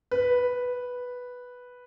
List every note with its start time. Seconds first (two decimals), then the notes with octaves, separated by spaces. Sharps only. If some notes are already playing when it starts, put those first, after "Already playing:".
0.11 B4